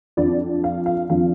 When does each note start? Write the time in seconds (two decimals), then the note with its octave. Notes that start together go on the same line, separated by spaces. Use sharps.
0.17 F2 F3 D4 D5
0.64 F5
0.86 F5
1.10 F2 F3 D4 F5